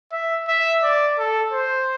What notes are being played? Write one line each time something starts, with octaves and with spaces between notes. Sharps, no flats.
E5
E5
D5
A4
C5